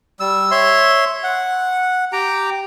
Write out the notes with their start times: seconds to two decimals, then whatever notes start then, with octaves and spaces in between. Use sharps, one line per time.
0.20 G3 E6
0.51 C#5 E5 C6
1.23 F#5
2.13 G4 G5 A#5